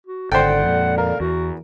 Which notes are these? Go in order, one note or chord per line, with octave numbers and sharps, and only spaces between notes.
F#4
G#1 D3 A4 C5 D5 F#5 G5
F2 A#2
A#4 F5
E2 F#4